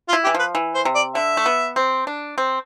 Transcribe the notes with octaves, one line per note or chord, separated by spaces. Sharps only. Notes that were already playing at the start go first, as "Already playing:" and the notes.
F4
E4
G4
E3
F3 B4
E3
C5
C3
D5
D3 E5
A3
B3
C4
D4
C4